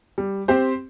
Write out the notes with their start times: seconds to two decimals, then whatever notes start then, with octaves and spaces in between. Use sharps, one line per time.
0.18 G3
0.48 C4 G4 C5